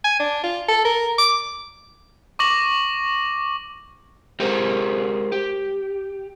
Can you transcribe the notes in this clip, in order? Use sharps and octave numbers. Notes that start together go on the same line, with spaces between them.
G#5
D4
F4
A4
A#4
D6
C#6 D6 A#6 F#7
G#3 G4 A#4 C5
G4